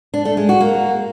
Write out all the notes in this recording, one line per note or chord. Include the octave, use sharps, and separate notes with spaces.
D4
A3
G#3
F#4
A#3